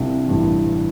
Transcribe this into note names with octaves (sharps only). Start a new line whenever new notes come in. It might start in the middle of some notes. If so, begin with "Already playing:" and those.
Already playing: C2 C3 G3 D4 F4
A1 G2 E3